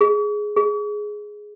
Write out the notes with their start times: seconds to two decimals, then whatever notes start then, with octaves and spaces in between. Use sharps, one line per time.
0.01 G#4
0.56 G#4